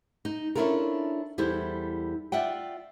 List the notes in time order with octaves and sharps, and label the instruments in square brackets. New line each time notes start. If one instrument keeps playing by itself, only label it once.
[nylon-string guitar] D#4
C#4 D4 E4 F4 A4 A#4
E2 G3 E4 A4 C5
F4 D5 E5 F#5 G5